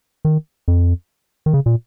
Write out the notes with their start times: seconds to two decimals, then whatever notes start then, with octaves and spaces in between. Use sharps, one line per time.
0.25 D#3
0.68 F2
1.46 D#3
1.54 C#3
1.66 A#2